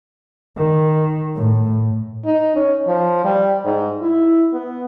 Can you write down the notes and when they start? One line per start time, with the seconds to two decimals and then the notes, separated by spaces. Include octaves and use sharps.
0.57 D#3
1.35 A2
2.25 D#4
2.56 C#4
2.87 F3
3.25 G3
3.65 G#2
4.02 E4
4.53 B3